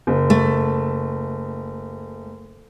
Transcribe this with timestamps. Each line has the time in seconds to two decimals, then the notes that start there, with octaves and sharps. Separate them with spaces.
0.07 F#1
0.30 A3